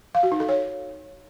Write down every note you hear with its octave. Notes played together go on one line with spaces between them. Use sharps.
F5
F#4
D#4
A4
C#5